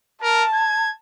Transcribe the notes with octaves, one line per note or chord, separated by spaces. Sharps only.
A#4 A5
G#6